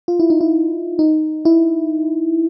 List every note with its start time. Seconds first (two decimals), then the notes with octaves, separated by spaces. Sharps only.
0.08 F4
0.20 E4
0.30 D#4
0.41 E4
0.99 D#4
1.45 E4